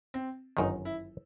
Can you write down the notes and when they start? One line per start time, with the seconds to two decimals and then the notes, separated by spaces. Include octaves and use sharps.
0.14 C4
0.57 G1 F#2 D#3 D#4
0.85 E4